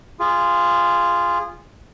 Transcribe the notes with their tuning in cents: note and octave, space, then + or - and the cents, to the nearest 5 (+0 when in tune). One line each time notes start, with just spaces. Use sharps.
F4 -10 G#4 -20